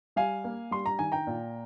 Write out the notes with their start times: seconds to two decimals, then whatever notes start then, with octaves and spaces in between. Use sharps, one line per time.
0.16 G3 F5 G#5
0.44 A#3
0.71 G3 C6
0.86 A#5
0.99 D#3 G#5
1.12 G5 A#5
1.27 A#2